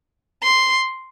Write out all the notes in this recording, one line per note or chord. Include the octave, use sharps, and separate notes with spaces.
C6